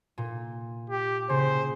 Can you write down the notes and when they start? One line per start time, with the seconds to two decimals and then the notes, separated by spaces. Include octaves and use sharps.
0.18 A#2
0.90 G4
1.29 C#3 C5